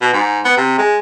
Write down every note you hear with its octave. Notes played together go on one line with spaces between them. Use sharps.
B2
G#2
B3
C3
G#3